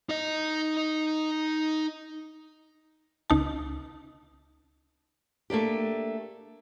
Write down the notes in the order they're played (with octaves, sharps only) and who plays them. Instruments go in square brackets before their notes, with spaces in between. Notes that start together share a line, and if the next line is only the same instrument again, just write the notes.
[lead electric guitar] D#4 D#5
[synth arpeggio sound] C#2 D#4 A5
[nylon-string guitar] A3 A#3 D4 G4